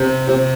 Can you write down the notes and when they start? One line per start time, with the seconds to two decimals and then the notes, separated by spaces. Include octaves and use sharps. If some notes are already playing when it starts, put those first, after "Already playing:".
Already playing: C3
0.28 C3